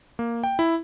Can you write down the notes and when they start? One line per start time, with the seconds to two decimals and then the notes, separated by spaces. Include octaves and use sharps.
0.19 A#3
0.44 G5
0.59 E4